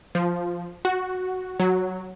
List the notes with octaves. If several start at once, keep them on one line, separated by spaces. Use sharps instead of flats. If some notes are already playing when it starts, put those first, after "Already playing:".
F3
F#4
F#3